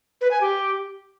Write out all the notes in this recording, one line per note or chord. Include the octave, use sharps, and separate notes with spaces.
B4
G#5
G4